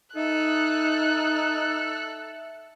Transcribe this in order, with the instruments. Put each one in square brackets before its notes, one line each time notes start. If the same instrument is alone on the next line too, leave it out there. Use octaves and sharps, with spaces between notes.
[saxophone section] D#4 [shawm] A4 [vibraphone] E5 [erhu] F#6